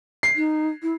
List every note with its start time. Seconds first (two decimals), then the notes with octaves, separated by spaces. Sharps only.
0.23 C7
0.36 D#4
0.82 E4